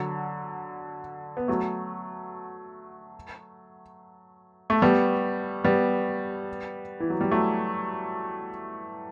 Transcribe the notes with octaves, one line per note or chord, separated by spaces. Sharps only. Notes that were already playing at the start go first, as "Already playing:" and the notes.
Already playing: D3 F#3
B3
F#3 A3
A3
G3 B3
G3 B3
E3
F#3
G3
F#3 A3